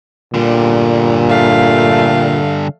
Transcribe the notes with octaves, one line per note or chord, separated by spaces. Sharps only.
A#2 D3 G3
A3 F5